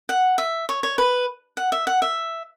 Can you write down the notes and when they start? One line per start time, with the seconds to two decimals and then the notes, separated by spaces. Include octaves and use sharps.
0.09 F#5
0.38 E5
0.69 C#5
0.83 C#5
0.98 B4
1.57 F#5
1.72 E5
1.87 F#5
2.02 E5